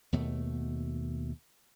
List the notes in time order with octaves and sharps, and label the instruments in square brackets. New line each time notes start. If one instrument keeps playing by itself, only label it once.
[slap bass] D#2 B2 A3